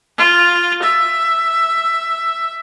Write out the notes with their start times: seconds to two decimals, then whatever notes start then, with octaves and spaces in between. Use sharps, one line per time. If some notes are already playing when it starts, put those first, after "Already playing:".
0.18 F4
0.83 E5